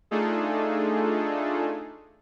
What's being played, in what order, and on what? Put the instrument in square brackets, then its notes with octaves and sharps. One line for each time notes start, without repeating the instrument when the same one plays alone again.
[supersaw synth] A3 D4 D#4 F4 G#4 A4